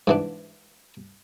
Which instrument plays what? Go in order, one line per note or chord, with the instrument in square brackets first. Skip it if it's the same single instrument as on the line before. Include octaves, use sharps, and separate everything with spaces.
[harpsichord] G#2 E3 D4